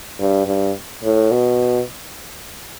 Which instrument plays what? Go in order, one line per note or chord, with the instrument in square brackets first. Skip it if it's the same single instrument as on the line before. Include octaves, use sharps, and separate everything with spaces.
[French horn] G2
G2
A2
B2